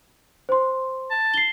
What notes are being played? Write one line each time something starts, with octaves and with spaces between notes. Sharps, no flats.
C5 C6
A5
C7 G7